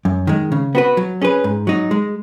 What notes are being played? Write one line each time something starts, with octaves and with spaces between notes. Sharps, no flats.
F#2
D#3 G#3
C#3
B3 F#4 B4
F#3
C#4 G#4 B4
G#2
F#3 D#4
G#3